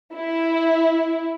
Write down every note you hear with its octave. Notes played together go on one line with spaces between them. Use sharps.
E4